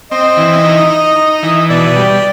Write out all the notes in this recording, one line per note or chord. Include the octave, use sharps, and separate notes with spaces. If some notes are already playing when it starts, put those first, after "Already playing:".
C4 D#5
E3
D#4
D#4
D#4
E3
B2 D5
G3